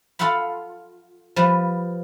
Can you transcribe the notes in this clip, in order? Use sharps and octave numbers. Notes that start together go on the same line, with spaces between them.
F4 A4 F5 F#5 B5
F3 G3 B4